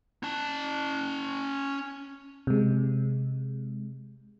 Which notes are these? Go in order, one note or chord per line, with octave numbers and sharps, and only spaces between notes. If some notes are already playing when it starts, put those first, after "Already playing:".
C#4 A5
C3 G#3